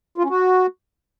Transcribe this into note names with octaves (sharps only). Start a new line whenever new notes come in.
F4
C#4
F#4